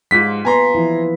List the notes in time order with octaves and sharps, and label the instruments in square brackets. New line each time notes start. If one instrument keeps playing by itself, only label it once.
[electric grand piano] G#2 B6 [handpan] G3 F4
[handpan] A#3 B3 B4 [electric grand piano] G#5 A#5 C6
[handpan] E3 F3 E4